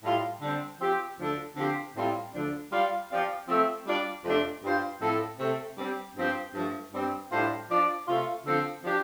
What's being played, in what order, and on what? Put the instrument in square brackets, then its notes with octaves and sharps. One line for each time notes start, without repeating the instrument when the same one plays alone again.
[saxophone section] A2 G3 F4
D3 G3 C4
F3 C4 G4
D2 D3 F3 D4 A4
D3 F3 C4 G4 C5
A2 G3 C4 F4
D2 D3 F3 D4
G3 F4 D5 F5
F3 C4 G4 D5 F5
F3 A3 C4
G3 D4 F4 D5
F2 C3 A3 D4 A4
G2 G3 F4 C5 F5
A2 F3 C4 A4
C3 A3 C4 A4
G3 C4 G4
G2 F3 C4 G4 C5
G2 F3 A3
G2 G3 C4
A2 G3 D4 F4 C5
F3 D4 F4 D5
C3 A3 F4
D3 F3 C4 A4 C5
F3 D4 G4